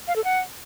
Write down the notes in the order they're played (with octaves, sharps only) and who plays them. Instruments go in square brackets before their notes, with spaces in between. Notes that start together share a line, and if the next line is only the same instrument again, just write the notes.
[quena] F5
A4
F#5